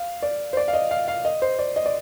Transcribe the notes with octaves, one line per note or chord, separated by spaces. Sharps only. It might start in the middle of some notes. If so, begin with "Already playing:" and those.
Already playing: F5
D5
C5
D5
F5
D#5
F5
F5
D#5
C5
D5
D#5
D5